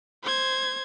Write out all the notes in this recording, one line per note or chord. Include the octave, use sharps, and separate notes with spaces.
C5 G#6